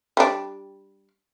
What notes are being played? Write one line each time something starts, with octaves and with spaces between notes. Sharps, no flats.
G3 D4